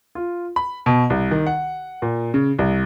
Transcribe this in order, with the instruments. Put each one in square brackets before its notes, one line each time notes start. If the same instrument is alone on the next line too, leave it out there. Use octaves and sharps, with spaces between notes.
[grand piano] F4
B5
B2
C2
D#3
F#5
A#2
C#3
C2